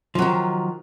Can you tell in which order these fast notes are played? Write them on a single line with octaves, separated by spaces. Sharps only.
F3 F#3 D#3